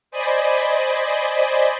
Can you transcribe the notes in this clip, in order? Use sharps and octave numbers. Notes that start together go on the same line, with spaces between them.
C5 D5 D#5 G#5 B5